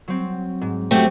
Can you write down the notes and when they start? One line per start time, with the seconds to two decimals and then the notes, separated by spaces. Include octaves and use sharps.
0.08 F#3 C4
0.61 G#2
0.91 F#3 A3 C4 C#4 F#4 G4